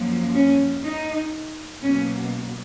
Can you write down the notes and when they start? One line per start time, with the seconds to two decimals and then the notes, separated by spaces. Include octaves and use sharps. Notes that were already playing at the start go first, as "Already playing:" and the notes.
Already playing: F#2 F3 A#3
0.35 C#4
0.84 D#4
1.84 B2 F#3 A#3 C#4